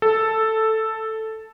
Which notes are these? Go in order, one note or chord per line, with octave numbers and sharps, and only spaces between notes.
A4